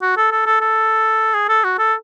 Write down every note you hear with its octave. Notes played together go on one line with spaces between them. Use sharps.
F#4
A4
A4
A4
A4
G#4
A4
F#4
A4